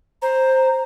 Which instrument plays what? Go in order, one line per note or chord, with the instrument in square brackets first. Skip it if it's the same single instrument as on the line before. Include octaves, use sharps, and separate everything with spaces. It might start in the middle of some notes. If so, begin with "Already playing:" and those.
[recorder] C5 [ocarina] A#5